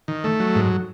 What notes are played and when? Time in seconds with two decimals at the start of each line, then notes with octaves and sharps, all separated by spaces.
0.08 D#3
0.24 A3
0.40 F#3
0.55 G#2